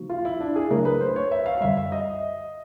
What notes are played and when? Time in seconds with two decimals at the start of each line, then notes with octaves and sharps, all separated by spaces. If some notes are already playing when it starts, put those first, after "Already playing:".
Already playing: C#3 F3 A#3 D#4 F#4
0.10 F4
0.25 E4
0.40 D4
0.56 G#4
0.71 C#3 F#3 A3 D4 A#4
0.85 B4
1.01 C5
1.16 C#5
1.31 E5
1.46 F5
1.58 F5
1.61 F#2 D3 G3 E5
1.77 E5
1.92 D#5